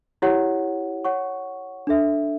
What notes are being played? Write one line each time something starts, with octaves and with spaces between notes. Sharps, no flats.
E4 G4 C#5 F#5
C#5 F#5 C#6
D4 A4 E5